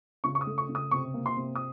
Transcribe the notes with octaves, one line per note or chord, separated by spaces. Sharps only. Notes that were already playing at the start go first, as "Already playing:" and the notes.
C#3 C#6
C#6
D#6
A3
C#6
C#3
D#6
C3 C#6
A#3
C6
C3
D#6